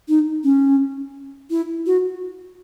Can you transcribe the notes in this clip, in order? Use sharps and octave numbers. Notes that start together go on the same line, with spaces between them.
D#4
C#4
E4
F#4